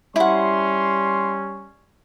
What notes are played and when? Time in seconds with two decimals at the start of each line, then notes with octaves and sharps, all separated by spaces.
0.16 G3 C#4 E4 F#5 C6